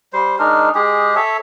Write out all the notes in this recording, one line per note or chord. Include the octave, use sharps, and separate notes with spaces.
G3 C5
G#3 D4 D#4 A#4
G#3 G4 G#4
A4 C#5 E5